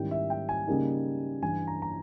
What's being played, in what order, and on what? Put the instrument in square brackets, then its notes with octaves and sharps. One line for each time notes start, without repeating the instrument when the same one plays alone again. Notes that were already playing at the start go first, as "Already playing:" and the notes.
Already playing: [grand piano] G#2 D#3 G3 C#4 E4 G5
E5
G5
G#5
C#3 G3 A#3 D#4
G2 E3 G3 G#5
A#5
A#5